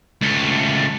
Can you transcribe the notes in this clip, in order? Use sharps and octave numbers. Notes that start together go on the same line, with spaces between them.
C#2 A3